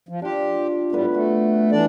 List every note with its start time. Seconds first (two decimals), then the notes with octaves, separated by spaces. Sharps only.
0.09 F3
0.22 D4 F4 G4
0.92 A2 G3 A3 B3 B4
1.14 A3 F#4
1.72 E3 D4 D5